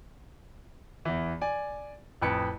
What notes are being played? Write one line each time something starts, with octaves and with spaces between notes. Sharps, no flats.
E2 E3
D5 G#5
A1 F2 B4 C#7